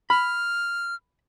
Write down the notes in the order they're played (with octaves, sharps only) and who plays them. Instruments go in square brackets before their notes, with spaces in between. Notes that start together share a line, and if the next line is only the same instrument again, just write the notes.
[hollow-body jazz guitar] B5 [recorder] F6